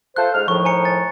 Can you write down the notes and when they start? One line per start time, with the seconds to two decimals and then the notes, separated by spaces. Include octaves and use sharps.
0.16 F4 A4 C5 F#6
0.34 G#2 F6
0.48 A2 D#3 F3 C#6
0.65 G#5 A#5 C#7
0.85 A6